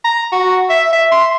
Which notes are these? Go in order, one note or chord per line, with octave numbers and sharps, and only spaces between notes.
A#5
F#4
E5
E5
C6